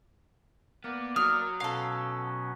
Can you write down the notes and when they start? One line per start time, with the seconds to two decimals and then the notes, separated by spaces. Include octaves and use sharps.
0.84 A#3 B3 A#4 D5
1.16 F#3 D#6 F6
1.60 B2 C#4 A4 F5